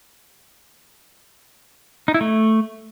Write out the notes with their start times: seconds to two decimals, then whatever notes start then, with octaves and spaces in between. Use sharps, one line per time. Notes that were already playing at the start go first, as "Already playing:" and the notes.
2.08 D#4
2.14 E4
2.21 A3